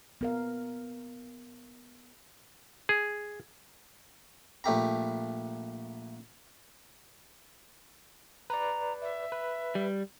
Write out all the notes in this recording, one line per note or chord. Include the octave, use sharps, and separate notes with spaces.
B3 A#4 F5
G#4
A#1 A3 G4 A#5
B4 D5 A#5
E5
B4
G3